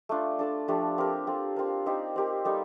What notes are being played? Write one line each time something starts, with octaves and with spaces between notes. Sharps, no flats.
A3 D4 F4
D4 A4 D5
F3 A3 D4 G4
C4 G4 A#4
C4 F4 A4
C4 F4 A#4
C4 D#4 G4 C5
C4 G4 A#4
G3 A#3 D#4 A4